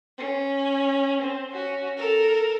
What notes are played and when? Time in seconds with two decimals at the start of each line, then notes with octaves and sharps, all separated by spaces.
0.18 C#4
1.22 C4
1.51 C#4 F#4
1.97 A4 A#4